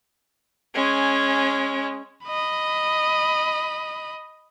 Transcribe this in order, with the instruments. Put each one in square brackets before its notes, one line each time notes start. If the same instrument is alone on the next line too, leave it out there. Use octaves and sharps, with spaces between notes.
[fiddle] G#3 C#4
[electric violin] D#5 B5